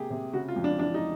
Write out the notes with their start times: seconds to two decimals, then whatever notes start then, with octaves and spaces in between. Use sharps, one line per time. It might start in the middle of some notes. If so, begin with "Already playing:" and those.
Already playing: C3 A#3 G4 G#4
0.10 C3
0.33 C#3 F#4
0.48 F4
0.56 F2
0.64 D4
0.78 E3 D4
0.94 D#4